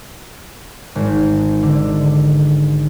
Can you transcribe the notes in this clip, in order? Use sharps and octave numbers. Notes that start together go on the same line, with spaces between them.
G#1
D3